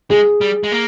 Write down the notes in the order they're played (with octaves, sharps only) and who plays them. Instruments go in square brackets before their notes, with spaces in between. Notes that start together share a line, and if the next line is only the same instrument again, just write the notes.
[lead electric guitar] G#3 [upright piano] G#4
[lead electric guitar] G3
G#3
A#3